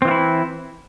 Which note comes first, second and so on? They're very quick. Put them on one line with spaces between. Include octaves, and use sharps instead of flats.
C4 E3 F4 E4